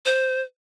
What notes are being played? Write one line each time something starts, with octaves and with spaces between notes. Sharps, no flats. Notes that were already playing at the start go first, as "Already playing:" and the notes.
C5